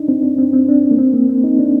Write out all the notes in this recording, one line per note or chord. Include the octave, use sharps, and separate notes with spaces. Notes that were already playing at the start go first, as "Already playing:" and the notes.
Already playing: D4 D#4
C4
D4
C4
C4
D4
A#3
C4
A#3
C4
D#4
D4